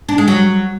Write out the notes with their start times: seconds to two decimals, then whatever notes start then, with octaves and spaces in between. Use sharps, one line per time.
0.09 D4
0.18 G#3
0.28 F#3